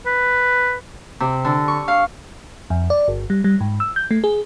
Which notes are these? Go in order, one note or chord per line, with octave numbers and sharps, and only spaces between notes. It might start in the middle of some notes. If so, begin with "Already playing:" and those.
B4
C3
D3
C#6
F5
F2
D5
G1
G3
G3
G#2
E6
G6
A3
G#4